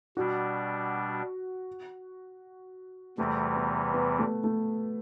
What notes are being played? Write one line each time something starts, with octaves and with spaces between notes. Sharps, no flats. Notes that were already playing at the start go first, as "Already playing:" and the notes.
B2 G3 D4 F#4
E2 C3 E3 G3 A3
B3
B3
A3
A3